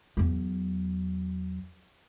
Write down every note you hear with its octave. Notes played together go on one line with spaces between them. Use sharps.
E2 F#3